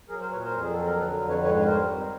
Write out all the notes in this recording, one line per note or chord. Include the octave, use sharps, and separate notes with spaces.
F#3 G#4 A#4
A#4 C5
A#2 B4 C#5
A#4 C5
F2
G#4
F#3 A4
A#4
D3 A4 B4
F2
B4 C#5
G#2 B4 C#5
B4
G3 A#4 C5
D#3